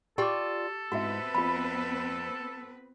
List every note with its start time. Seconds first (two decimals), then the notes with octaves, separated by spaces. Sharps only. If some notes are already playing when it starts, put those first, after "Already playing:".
0.18 F4 G4 A4 D5 G5 D6
0.92 G#2 B3 C4 E4 F#4 B4 E5
1.34 F2 F4 B5